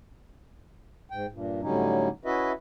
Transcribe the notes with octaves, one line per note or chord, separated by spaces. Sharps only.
G#2 G5
G2 A#2
A2 D3 F#3 G3 C#4 D#4
C#4 E4 F#4 B4 D#5 E5